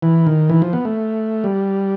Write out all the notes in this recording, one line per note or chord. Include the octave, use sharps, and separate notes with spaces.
E3
D#3
E3
F3
B3
A3
G3